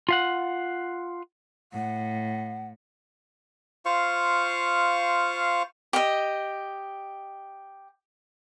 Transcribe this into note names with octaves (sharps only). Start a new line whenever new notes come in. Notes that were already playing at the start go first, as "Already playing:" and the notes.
F4 F5 F#5
A2 F#5
F4 C5 F5 C#6
G4 D#5